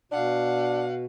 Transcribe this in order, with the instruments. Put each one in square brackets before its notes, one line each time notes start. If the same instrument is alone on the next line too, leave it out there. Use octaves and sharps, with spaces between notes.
[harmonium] B2 [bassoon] D4 [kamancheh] F5 F#5